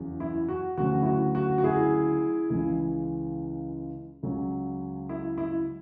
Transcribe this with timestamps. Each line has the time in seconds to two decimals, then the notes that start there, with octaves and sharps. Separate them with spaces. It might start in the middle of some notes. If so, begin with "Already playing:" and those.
Already playing: E2 C#3 F#3
0.20 E4
0.49 F#4
0.77 D2 C#3 F#3 F#4
1.02 E4
1.06 F#4
1.35 F#4
1.58 F#4
1.64 E4 G#4
2.50 C#2 C#3 E3
4.23 C#2 C#3 F#3
5.09 E4
5.38 E4